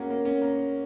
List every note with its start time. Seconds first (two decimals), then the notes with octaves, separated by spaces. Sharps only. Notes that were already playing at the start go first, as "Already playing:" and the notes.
Already playing: A#3 C#4 F#4 G#4
0.10 A#3
0.25 C#4
0.42 A#3